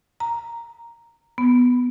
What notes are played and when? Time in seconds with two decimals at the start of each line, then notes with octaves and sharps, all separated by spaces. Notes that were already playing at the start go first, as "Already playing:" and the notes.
0.20 A#5
1.38 B3